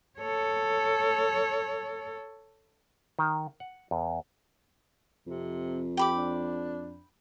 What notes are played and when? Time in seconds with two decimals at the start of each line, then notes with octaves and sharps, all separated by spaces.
0.19 A4 C#5
3.19 D#3
3.60 F#5
3.91 E2
5.27 F2 C3
5.97 G4 G5 B5 D6
6.14 D4